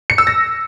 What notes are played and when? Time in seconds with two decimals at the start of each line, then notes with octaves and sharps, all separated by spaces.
0.10 C#7
0.18 E6
0.27 A#6